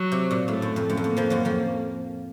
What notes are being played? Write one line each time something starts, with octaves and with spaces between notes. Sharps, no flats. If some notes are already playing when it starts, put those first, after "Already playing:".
Already playing: F#3
C3
A#2
A2 A3
F#2
F2
F#2
F2
F#2 A#3
F2 F3
F#2 F#3
F2 F3